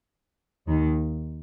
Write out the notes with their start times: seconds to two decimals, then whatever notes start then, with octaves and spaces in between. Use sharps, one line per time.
0.68 D#2 D#3